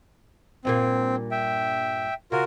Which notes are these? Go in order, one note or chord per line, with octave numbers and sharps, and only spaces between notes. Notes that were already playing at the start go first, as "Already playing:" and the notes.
G2 A#2 A#3 C4
E5 G5
C#3 F4 F#4 A#4